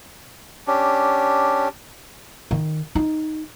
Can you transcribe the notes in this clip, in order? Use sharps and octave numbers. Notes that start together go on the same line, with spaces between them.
C#4 D4 G4
D#3
D#4